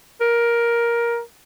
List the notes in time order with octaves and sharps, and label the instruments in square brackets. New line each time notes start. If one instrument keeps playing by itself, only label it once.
[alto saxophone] A#4